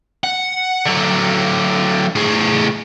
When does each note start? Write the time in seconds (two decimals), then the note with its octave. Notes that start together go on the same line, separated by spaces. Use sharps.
0.24 F#5
0.86 D3 F#3
2.15 A2 G#4